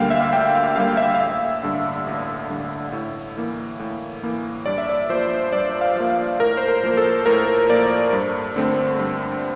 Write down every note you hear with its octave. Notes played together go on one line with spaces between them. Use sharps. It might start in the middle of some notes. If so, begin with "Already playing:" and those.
Already playing: D2 D3 G3 A#3 F5 G5
E5
F5
D2 G5
F5
D3 G3 A#3 F5
E5
F5
A1 E5
G2 D3
A1
G2 D3
A2
E3 A#3
A2
E3 A#3
G2 D5
E5
D5
F3 A#3 C5
G2 D5
F5
F3 A#3
F5
A2 A#4
C5
A#4
F3 A#3
A4
A2 A#4
F3 A#3 D5
G2
D3 A3 C4
G2